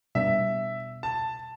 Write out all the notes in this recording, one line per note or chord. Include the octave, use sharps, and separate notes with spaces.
B2 G3 B3 D4 E5
A5